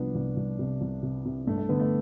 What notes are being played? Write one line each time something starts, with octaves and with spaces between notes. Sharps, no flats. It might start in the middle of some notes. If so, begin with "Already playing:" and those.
Already playing: C2 F3 B3 D4
C2
C2
C3
C2
C3
C3
G2 A3
A3
D3 B3
A3